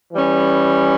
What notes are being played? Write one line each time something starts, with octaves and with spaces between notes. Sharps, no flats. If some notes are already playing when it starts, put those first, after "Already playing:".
E3 G3 C#4